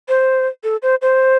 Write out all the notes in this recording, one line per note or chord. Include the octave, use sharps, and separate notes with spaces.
C5
A4
C5
C5